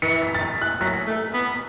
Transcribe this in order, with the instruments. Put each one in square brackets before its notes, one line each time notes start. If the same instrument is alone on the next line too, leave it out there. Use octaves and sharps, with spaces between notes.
[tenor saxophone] E3 [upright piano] C#7
[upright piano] B6
A6
B6
F#6
[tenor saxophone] F#3 [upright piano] B6
[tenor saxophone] A3
B3